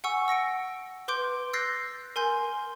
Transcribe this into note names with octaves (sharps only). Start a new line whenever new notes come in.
F#5 G#5 C#6 E6
E6 A#6 C#7 D7
B4 C6 D6 G6 D7
E6 F#6 G6 A6 A#6 C7
A#4 G#5 C6 G6